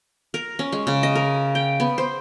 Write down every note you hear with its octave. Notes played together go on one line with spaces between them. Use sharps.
A#4
C#4
G#3
C#3
D#5
A#4
G5
B3
C5